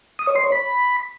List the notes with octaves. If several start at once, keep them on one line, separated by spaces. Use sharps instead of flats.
D#6
C#5
C6
C#5
B5